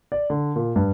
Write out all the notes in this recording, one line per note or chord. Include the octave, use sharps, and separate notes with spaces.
D5
D3
A#2
G2